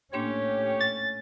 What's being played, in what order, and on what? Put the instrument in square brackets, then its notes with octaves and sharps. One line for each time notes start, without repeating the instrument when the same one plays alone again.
[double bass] A2 C#4 [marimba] A#3 D4 C6 [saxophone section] G4 C#5
[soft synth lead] A6